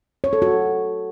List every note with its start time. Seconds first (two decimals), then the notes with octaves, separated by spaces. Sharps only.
0.24 C#5
0.33 A4
0.42 F#4